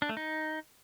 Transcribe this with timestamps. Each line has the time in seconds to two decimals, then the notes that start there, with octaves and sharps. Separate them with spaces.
0.02 D4
0.09 A3
0.17 D#4